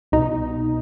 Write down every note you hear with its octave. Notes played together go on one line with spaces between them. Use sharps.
C2 B2 D#4